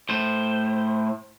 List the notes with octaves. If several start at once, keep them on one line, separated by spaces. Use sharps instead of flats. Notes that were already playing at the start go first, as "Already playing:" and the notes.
A2 C5